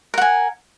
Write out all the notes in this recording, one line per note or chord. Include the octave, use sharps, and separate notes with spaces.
A#4 F#5 G#5